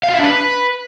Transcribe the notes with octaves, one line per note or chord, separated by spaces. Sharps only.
F5
F4
E4
D4
B4